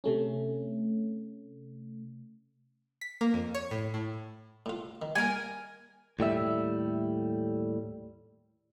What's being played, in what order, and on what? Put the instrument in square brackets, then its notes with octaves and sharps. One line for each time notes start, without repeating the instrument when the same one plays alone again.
[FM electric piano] C3 A3 C#4
[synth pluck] B6
A#3
F2
C#5
A2
A2
[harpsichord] A2 F4
D#3
[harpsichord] G3 A#3 [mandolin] A#4 G#5
[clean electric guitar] D#2 A2 G3 E5